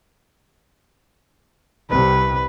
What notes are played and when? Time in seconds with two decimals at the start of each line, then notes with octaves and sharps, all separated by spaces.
1.90 C2 C3 B4